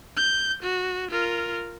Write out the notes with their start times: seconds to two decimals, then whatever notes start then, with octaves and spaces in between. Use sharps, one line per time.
0.17 G6
0.63 F#4
1.11 F4 A#4